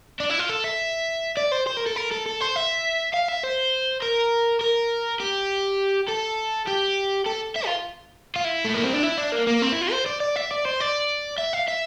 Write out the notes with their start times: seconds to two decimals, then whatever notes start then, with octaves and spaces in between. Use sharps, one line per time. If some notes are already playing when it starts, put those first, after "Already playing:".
0.20 D4
0.30 E4
0.39 F4
0.49 A4
0.64 E5
1.37 D5
1.52 C5
1.67 C5
1.77 A#4
1.86 A4
1.96 A#4
2.11 A4
2.26 A4
2.41 C5
2.56 E5
3.14 F5
3.29 E5
3.43 C5
4.02 A#4
4.61 A#4
5.20 G4
6.08 A4
6.68 G4
7.26 A4
7.56 E5
7.66 F4
8.36 F4
8.44 E4
8.65 A3
8.74 A#3
8.84 C4
8.93 D4
9.03 E4
9.17 D4
9.32 A#3
9.47 A#3
9.62 C4
9.72 E4
9.81 F4
9.92 C5
10.06 D5
10.20 D5
10.36 E5
10.51 D5
10.65 C5
10.80 D5
11.38 E5
11.53 F5
11.68 E5